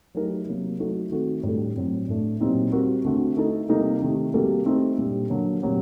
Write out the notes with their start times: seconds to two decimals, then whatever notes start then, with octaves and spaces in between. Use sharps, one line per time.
0.15 F#3 A3 D#4 G4 A#4
0.47 C3 F#3 A#3
0.79 F#3 A3 D#4 F#4 A4
1.11 D#3 A3 C4 F#4 A4
1.43 A2 G3 D4 A4
1.76 A2 F#3 C4
2.08 A2 A3 D4
2.40 A#2 F#3 C4 D#4 G4
2.72 G3 C4 F#4 A#4
3.05 D3 A3 C4 F#4
3.37 A3 D#4 A4
3.69 C3 G3 A#3 D#4 A4
4.02 C3 D#3 A3
4.34 C3 G3 A#3 F#4 A4
4.66 A3 C4 D#4 G4
4.98 A#2 G3 D4
5.30 D3 F#3 A#3
5.62 A#2 F#3 C4 G4